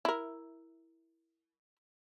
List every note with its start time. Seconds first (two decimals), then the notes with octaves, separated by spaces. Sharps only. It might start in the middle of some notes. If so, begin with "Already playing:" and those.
0.05 E4 A#4